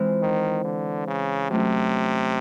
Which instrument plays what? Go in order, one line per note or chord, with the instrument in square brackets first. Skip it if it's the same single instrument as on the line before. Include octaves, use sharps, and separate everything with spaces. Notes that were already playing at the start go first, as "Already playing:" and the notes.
Already playing: [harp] E3 G#3 C4 F4
[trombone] D#3
D3
C#3
[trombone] C3 [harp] F#3 A3 C#4 F4